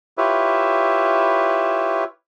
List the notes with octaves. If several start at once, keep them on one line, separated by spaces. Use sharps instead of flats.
E4 F4 G4 B4 C#5 E5